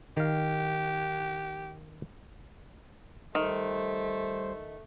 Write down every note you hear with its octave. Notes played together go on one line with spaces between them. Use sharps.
D#3 G4 F5
D#3 G3 A3 C5